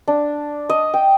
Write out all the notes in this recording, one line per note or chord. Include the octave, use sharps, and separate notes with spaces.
D4
D#5
G5